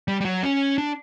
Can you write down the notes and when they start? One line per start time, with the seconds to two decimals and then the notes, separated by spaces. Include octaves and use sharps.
0.08 G3
0.21 G3
0.25 F#3
0.43 C#4
0.78 D4